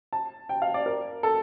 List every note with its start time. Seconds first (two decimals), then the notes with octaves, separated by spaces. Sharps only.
0.13 A5
0.49 G5
0.62 F5
0.74 D5
0.86 A#4
1.23 A4